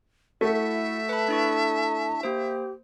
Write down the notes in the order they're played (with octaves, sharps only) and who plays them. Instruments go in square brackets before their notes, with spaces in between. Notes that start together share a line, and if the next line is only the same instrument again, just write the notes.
[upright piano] A3 [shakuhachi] E4 [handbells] F#4 F#5 [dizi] E5
[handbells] B4 B5 [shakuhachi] A5
[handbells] D4 E4 C#6
[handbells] A#3 C5 [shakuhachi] G4